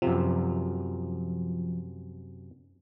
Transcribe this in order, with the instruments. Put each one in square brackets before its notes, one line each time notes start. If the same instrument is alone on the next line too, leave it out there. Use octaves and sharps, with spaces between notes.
[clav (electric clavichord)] F#2 C3 [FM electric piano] F3